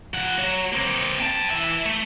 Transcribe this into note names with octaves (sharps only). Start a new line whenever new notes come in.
F3 F#5
F#3
A#3 C4
G5 A5
E3 E5
A3